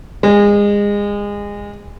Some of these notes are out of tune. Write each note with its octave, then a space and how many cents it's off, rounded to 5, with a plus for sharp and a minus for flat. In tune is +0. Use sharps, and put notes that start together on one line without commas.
G#3 -25